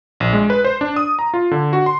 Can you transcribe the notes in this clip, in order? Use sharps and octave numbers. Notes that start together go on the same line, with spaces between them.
A#1
G#3
B4
C5
D4
D#6
A#5
F4
D3
F#4
C6